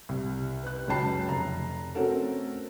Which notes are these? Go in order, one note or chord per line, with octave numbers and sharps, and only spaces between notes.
C2
B4 F#6
C#2 F#2 C#4 G5 A5 C7
F1 A#5
A3 C4 C#4 F#4 A4 A#4